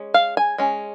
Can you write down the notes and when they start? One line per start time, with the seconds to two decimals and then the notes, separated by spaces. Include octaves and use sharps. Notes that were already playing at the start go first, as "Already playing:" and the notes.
Already playing: G#3 C#4
0.14 F5
0.37 G#5
0.58 G#3 C#4